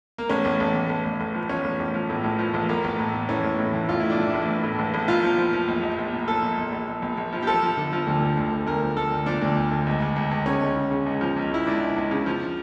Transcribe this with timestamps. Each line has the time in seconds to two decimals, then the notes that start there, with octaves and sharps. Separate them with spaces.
0.18 A#3
0.29 A1 C#4
0.45 A1
0.60 A1
0.75 A1
0.89 A1
1.05 A1
1.20 A1
1.35 F3
1.49 F3 C#4
1.64 A1
1.79 A1
1.94 F3
2.10 A2
2.24 A1
2.39 F3
2.54 A1
2.69 A1 A#3
2.84 A1
2.99 A2
3.14 A2
3.29 E3 C#4
3.44 A1
3.59 A2
3.73 E3
3.89 A1 F4
4.00 A2 E4
4.10 D4
4.19 E3 E4
4.34 A1
4.48 A1
4.63 A2
4.79 A1
4.94 A1
5.08 A#2 F4
5.23 F3
5.38 F3
5.53 F3
5.68 A#1
5.83 A#1
5.98 A#1
6.13 A#2
6.28 F3 A4
6.42 A#2
6.58 A#1
6.72 A#1
6.87 A#1
7.02 A#1
7.18 A#1
7.33 F3
7.42 G4
7.47 F3 A4
7.63 F3
7.77 D3
7.93 F3
8.07 D2
8.22 D3
8.37 D2
8.52 D3
8.67 D2 A#4
8.82 F3
8.97 D2 A4
9.12 D2
9.26 F3 D4
9.42 D2
9.57 D2
9.72 D2
9.86 C#2
10.02 C#2
10.16 C#2
10.31 C#2
10.46 C#3 C#4
10.62 C#2
10.76 C#3
10.91 C#3
11.06 C#2
11.21 F3
11.36 C#2
11.51 C#2 E4
11.67 C#2 D4
11.81 C#2
11.96 C#2
12.11 C#3
12.26 F3